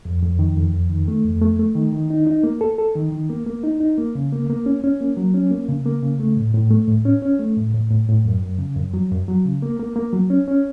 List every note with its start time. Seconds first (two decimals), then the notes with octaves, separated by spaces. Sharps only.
0.05 F2
0.22 F2
0.39 D#3
0.56 F2
0.73 F2
0.90 D#3
1.08 A3
1.25 F2
1.42 A3
1.59 A3
1.75 D#3
1.93 D#3
2.10 D#4
2.27 D#4
2.43 A#3
2.61 A4
2.78 A4
2.96 D#3
3.12 D#3
3.30 A#3
3.46 A#3
3.64 D#4
3.80 D#4
3.98 A#3
4.15 C#3
4.33 A#3
4.50 A#3
4.66 C#4
4.84 C#4
5.01 A#3
5.17 F#3
5.34 C#4
5.51 A#3
5.69 C#3
5.86 A#3
6.02 C#3
6.20 A3
6.37 A2
6.54 A2
6.71 A3
6.88 A2
7.05 C#4
7.22 C#4
7.39 A3
7.57 A2
7.74 A2
7.90 A2
8.08 A2
8.25 F#2
8.42 F#2
8.59 C#3
8.76 F#2
8.94 F#3
9.11 F#2
9.28 F#3
9.45 C#3
9.62 A#3
9.79 A#3
9.96 A#3
10.13 F#3
10.30 C#4
10.48 C#4